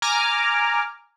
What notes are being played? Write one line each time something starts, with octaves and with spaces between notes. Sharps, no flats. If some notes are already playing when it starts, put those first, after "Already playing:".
G#5 A#5 D6 F6